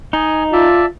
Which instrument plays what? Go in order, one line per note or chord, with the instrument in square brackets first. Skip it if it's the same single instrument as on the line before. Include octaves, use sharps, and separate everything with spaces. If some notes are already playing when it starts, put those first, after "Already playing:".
[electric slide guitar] D#4 [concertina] D#5 G#5
[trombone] F4 [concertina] D5 E5 A5